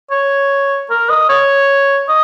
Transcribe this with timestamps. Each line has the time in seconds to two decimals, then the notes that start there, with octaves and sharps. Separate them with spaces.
0.11 C#5
0.90 A#4
1.10 D#5
1.29 C#5
2.09 D#5